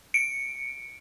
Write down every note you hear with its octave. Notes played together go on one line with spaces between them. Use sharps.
C#7 D7